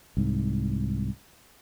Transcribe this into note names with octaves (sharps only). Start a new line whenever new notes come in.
C2 G#2